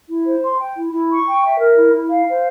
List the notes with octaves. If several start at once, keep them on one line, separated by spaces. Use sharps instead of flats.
E4
C5
C6
G5
E4
E4
C#6
G5
E5
A#4
E4
E4
F5
C5